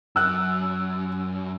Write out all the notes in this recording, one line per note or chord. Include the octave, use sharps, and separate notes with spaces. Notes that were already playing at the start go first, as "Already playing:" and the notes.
F#2 E6 F#6